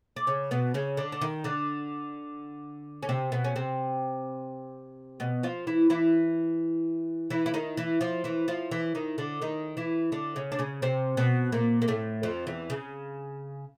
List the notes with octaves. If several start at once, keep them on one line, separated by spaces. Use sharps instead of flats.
D4
C#3 C#4
B2 B3
C#3 C#4
D3 D4
D4
D#3 D#4
D3 D4
C#4
C3 C4
B2 B3
C#4
C3 C4
B2 B3
F3 F4
E3 E4
E3 E4
E3 E4
E4
D#3 D#4
E3 E4
F3 F4
E3 E4
F3 F4
E3 E4
D#3 D#4
D3 D4
D#3 D#4
E3 E4
D3 D4
C#3 C#4
D4
C#3 C#4
C3 C4
B2 B3
A#2 A#3
A#3
A2 A3
F2 F3
E2 E3
C#3